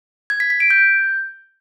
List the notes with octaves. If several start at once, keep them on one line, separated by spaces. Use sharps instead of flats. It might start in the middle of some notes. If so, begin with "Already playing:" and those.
G#6
B6
B6
D7
G6